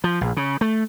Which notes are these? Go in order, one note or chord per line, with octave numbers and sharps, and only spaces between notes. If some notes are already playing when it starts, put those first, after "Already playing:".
F3
A#1
C#3
A3